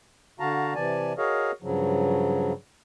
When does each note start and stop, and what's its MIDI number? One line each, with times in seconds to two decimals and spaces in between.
0.40 0.73 50
0.40 0.73 66
0.40 0.73 77
0.40 0.73 81
0.40 0.73 82
0.75 1.13 48
0.75 1.13 52
0.75 1.13 74
0.75 1.13 80
0.75 1.13 81
1.18 1.51 66
1.18 1.51 68
1.18 1.51 70
1.18 1.51 73
1.18 1.51 75
1.18 1.51 77
1.63 2.53 43
1.63 2.53 49
1.63 2.53 53
1.63 2.53 54